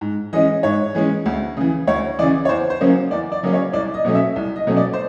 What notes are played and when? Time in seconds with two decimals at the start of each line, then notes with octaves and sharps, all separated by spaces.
0.01 G#2
0.33 E3 G#3 C#4 D#5
0.63 G#2 C#5
0.95 E3 G#3 C#4
1.26 D2
1.57 C#3 E3
1.87 D2 C#5
2.19 C#3 E3 D5
2.45 C#5
2.49 E2 C5
2.70 C5
2.81 C#3 F#3 A#3 C#4
3.11 E2 D5
3.32 D5
3.43 C#3 F#3 A#3 C#4
3.53 C#5
3.73 C2 D5
3.94 D#5
4.05 B2 F#3 A3 C#4
4.15 E5
4.36 C2
4.56 D#5
4.67 B2 F#3 A3 C#4
4.77 D5
4.93 C5